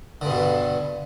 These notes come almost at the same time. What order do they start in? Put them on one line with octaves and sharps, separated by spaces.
D3 G2 B2